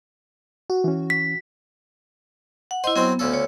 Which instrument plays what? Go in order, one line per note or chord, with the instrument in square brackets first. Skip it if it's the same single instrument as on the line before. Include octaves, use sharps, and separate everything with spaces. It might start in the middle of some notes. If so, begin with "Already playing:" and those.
[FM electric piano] F#4
[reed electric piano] E3 C#4
[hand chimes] B6
[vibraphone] F#5
[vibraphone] E4 D#5 [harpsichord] C5
[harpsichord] F#3 C4 C5 [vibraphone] B3
[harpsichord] D2 C#3 A4
[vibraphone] C#5